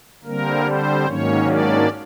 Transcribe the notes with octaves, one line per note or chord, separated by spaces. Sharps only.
D3 G3 A#3 C4 A#4
C4 C5
G#2 D#3 F#3 A#3 C#4 C#5
D4 D5